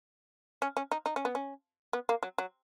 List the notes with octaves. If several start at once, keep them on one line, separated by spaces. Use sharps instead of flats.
C#4
C#4
D#4
D#4
C#4
B3
C#4
B3
A#3
F#3
F#3